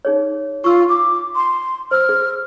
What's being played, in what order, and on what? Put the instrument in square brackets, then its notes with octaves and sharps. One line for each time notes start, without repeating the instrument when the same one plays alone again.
[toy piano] D#4 G#4 C#5
[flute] F4 [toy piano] C#6 E6
[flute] D6
C6
[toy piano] C5 E6 [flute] F6
[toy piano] G#4